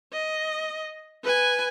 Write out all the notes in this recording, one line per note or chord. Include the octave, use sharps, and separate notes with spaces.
D#5
B4 G#5